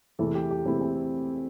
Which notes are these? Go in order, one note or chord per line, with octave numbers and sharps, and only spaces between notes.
E2 C3 E3 A3 E4 A4
G4
G4
E2 C3 E3 A3 C4 E4
C4